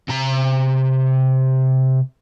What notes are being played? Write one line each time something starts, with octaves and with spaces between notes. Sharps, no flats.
C3 A#5